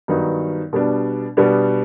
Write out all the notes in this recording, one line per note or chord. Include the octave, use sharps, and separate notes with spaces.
G2 D#3 F#3 B3 D#4
B2 G3 B3 D4
B2 G3 B3 D4